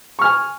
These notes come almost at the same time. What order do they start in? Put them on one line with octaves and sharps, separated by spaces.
C#6 F6 G#5